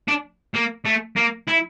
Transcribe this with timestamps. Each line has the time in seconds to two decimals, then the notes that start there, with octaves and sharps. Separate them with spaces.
0.08 D4
0.55 A#3
0.86 A3
1.17 A#3
1.48 E4